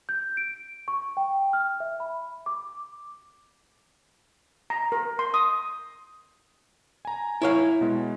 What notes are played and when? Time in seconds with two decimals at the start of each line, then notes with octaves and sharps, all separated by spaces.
0.09 G6
0.37 D7
0.88 C#6
1.17 G5
1.53 F6
1.80 E5
2.00 B5
2.46 D6
4.70 A#5
4.92 A#4
5.19 C6
5.34 D#6
7.05 G#5 A#5
7.42 E4 C#5 F5
7.81 B2 G#3